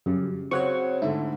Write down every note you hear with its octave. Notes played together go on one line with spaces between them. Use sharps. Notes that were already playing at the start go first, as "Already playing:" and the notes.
F#2 C#3 G3
C#3 C4 F#4 C#5 F#5 C#6
G#2 D3 A3 E4